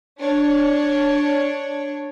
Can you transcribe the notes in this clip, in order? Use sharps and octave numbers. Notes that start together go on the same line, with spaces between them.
D4 C#5